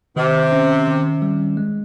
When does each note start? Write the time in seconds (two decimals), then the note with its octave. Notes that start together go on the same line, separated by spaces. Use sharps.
0.16 C3 D#3
0.52 C#4
0.88 D#3
1.22 G3
1.57 G#3